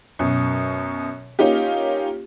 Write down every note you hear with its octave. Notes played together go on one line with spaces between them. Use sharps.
F#2 B2
A#3 C#4 D#4 F4 G4